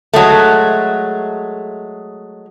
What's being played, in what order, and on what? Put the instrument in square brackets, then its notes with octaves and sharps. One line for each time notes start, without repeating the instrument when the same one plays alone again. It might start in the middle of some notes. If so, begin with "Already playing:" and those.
[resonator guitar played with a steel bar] F#3 G#3 A3